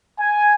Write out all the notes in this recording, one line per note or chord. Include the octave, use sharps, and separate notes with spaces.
G#5